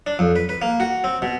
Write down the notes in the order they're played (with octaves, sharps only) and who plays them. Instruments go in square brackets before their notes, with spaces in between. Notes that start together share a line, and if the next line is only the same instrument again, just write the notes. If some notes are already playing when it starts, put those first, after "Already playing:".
[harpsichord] D4
F2
B4
B4
A#3
F#4
C4
B2